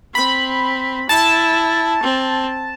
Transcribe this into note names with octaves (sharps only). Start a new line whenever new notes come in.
C4 B5
E4 A5
C4